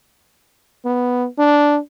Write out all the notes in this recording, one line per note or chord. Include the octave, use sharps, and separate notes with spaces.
B3
D4